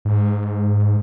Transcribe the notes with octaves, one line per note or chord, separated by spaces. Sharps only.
G#2